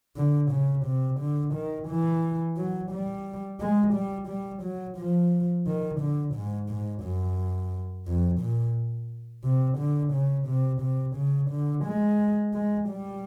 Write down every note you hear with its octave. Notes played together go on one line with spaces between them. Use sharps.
D3
C#3
C3
D3
D#3
E3
F#3
G3
G#3
G3
G3
F#3
F3
D#3
D3
G#2
G#2
F#2
F2
A#2
C3
D3
C#3
C3
C3
C#3
D3
G#3
G#3
G3